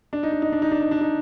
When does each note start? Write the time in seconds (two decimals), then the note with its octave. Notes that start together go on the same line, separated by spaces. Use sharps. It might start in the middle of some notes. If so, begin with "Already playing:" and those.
0.13 D4
0.23 D#4
0.32 D4
0.42 D#4
0.52 D4
0.62 D#4
0.72 D4
0.82 D#4
0.91 D4
1.01 D#4